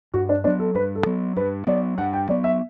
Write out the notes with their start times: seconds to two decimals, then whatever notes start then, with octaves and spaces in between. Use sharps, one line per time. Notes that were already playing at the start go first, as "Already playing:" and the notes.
0.14 G2 F#4
0.29 D4
0.44 F#3 B3 D4
0.59 A4
0.75 G2 B4
0.95 A4
1.06 F#3 B3
1.36 G2 B4
1.67 F#3 B3 D5
1.98 G2 F#5
2.13 G5
2.29 F#3 B3 D5
2.44 E5